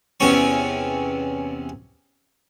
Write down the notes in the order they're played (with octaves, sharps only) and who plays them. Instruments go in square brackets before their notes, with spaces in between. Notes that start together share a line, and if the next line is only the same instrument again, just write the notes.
[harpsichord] E2 C3 C#4 C#6